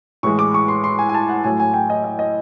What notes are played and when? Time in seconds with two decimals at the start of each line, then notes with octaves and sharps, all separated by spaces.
0.23 A2 E3 G#3 C#6
0.39 D6
0.54 C#6
0.68 C6
0.84 C6
0.99 G#5
1.09 G#5
1.14 A5
1.29 F#5
1.44 A2 F#3 A3 G#5
1.60 G#5
1.74 G5
1.90 D#5
2.04 D#5
2.19 D#5